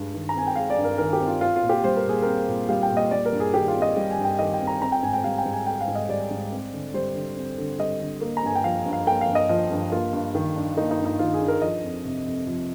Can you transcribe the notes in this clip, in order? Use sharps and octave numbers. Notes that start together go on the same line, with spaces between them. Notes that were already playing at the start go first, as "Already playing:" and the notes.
Already playing: G2 G#3
D#3
A#5
C4 G#5
G5
G#3 F5
D5
G2
A#4
D#3 A#4
G4
C4
F4
C4 F4
F4
A#2
G4
G3 C5
A#4
A#2 G#4
C4 A#4
A#2
G3 F5
G5
A#2
D#5
G3 D5
A#4
G2
G#4
D#3 G4
F4
C4
D#5
G3
G#5
G2
G5
D#3 D#5
G5
C4
A#5
C4 A#5
G5
G#2 G#5
G5
G3 F5
G5
G#2
G#5
C4 G5
F5
G#2
D#5
G3 D5
G#2
C4
D3
G3 C5
D3
C4
D3
G3 D#5
D3
A#3
A#5
G2 G#5
G5
F3 F5
G2
F5
A#3 G5
F5
G2
D#5
F3 D#5
G2
A#3 F4
G2
D#3
D4
A#3 D#4
D#4
G2
D#4
D#3 F4
G#4
D4
A#4
F3 D#5
F2
C3
F2
F3